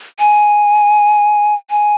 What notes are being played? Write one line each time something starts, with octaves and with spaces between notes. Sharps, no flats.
G#5
G#5